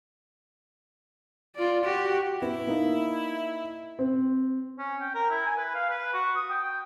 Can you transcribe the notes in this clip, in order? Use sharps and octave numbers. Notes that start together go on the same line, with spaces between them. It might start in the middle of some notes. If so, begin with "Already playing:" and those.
F4 D5
F#4 G4
B3 E4
A#3 D#4
C4
C#4
G5
A#4
E4
G#5
B4
F5
B4
F#4
D#6
G5
G5